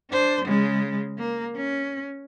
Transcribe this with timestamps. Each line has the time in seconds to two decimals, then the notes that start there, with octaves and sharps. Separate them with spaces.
0.11 D4 C5
0.46 C#3 G#3
1.18 A#3
1.56 C#4